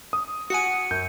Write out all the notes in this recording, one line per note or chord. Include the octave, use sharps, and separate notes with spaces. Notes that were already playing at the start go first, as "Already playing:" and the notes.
D#6
F#4 F#5 G#5 C#7 D#7
F#2 G6